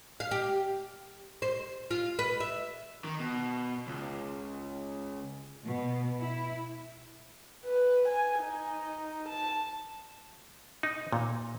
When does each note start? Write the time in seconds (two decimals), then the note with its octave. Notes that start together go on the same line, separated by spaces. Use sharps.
0.20 F5
0.31 G4
1.42 C5
1.91 F4
2.19 B4
2.40 E5
3.04 D#3
3.19 B2
3.87 C#2
5.65 B2
6.21 E4
7.65 B4
8.08 G#5
8.40 D#4
9.28 A5
10.83 D#4
11.12 A#2